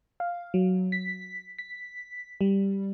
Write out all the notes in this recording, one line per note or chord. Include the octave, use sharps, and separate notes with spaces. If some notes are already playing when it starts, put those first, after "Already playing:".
F5
F#3
B6
B6
G3